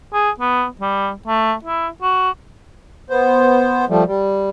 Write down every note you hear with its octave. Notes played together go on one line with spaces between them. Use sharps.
G#4
B3
G3
A3
E4
F#4
B3 C5
F3 G3 A3
G3